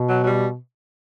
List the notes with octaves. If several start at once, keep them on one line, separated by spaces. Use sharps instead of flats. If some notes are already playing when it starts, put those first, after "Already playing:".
Already playing: B2
F#3
F#3
G3